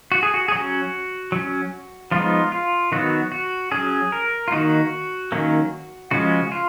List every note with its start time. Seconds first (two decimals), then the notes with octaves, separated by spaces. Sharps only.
0.12 F#4
0.23 G#4
0.34 F#4
0.48 G#4
0.52 F#3 C#4 F#4
1.32 F#3 C#4
2.11 F3 G#3 B3 D#4 F4
2.52 F4
2.92 D#3 F#3 B3 F#4
3.32 F#4
3.72 F#3 C#4 G#4
4.12 A#4
4.48 F4
4.52 D#3 A#3 D#4 F#4
5.32 D#3 F#3 A#3 C#4
6.11 C#3 F3 G#3 C#4 F#4
6.52 F4